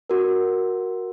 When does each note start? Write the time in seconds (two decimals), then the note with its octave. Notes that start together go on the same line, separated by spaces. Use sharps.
0.10 F#4 A#4